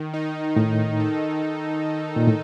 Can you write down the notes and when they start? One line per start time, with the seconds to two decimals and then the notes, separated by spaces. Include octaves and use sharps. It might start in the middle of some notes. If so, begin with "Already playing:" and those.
Already playing: D#3
0.14 D#4
0.56 A2 D#3
1.00 A4
1.42 D#3
1.85 D#3
2.16 A#2
2.28 A2 D#4